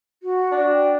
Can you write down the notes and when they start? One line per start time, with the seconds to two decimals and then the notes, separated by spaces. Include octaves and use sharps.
0.23 F#4
0.52 D4
0.72 G5